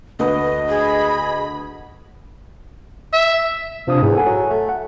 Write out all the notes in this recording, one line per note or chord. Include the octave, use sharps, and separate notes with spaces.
D2 B4 D#5 D#6
G#4 B5
E5
C3 F3 D4 D#6
E2 G#2
A4 F#5 G#5
F#3
A3
F#5